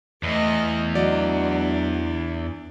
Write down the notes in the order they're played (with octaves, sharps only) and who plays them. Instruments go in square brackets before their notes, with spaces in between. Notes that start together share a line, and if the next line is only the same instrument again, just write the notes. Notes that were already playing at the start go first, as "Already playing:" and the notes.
[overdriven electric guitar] E2 [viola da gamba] A3 D#5
[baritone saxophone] F#3 [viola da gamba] D4 [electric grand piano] D5 D#5